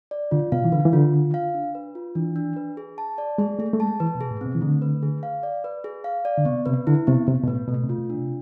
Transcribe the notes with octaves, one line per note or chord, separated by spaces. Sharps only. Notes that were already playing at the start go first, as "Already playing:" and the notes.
D5
D3 F4
B2 F5
E3
D3 B4
E3
D3 F4
F4
F5
D4
B4
F4
E3 D4
D4
B4
G#4
A5
D5
G#3 G#4
A3 G#4
A3
G#3 A5
E3 B4
B2
G#4
A2
B2 C4
E3
D3 A3
B4
G#4
F5
D5
B4
G#4
F5
D5
D3
C3 B3
C3 B4
D3 E4
C3 B3
C3 B3
B2
A2 B4
B2 A3
C3
F4
B2
D4
C3